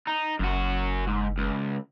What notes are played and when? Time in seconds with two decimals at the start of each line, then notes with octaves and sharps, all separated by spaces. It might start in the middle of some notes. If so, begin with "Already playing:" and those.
0.07 D#4
0.39 F#1 F#2 F#4
1.07 G#2
1.38 C#2